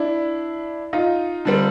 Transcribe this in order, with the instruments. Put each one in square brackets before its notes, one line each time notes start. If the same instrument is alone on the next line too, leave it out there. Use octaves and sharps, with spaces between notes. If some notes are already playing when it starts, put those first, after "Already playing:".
Already playing: [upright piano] D4 E4
D#4 F4
[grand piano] D3 G3 C4